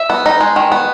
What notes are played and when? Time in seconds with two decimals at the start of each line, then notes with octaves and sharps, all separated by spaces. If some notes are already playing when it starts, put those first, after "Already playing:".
Already playing: E5
0.10 B3
0.26 D#4
0.41 G#3
0.56 D#3
0.72 B3